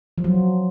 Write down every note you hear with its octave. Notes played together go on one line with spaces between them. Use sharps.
F3
F#3